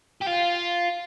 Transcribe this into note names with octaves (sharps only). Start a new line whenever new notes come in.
G4
F4